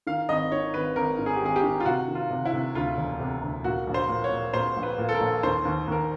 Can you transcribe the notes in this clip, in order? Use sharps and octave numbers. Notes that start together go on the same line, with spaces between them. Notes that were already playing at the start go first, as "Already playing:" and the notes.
D#3 F5
G#1 D#5
D#3 C#5
G#1 B4
G#1 A#4
G#2
G#4
G4
G#1 G#4
G4
D#3
F4
C3 F#4
D#3
F4
C3
E4
C3
D2 F4
E1
C3
D2
A#2 F#4
A#1
C5
A#2
C#5
A#2
A#2 C5
A#1
B4
A#2
A4
A#4
A#1
D#2 C5
D#2
D#2 A#4